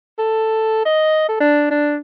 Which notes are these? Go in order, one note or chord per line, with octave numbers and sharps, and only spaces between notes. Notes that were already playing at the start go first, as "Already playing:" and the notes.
A4
D#5
A4
D4
D4